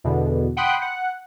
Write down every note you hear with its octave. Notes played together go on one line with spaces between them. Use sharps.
E2 B2 D3
F#5 G5 B5 C6 D#6 F#6
F#5